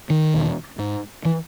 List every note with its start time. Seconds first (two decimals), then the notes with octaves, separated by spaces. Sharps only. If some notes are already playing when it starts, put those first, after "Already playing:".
0.10 D#3
0.34 E2 B2
0.79 G#2
1.25 E3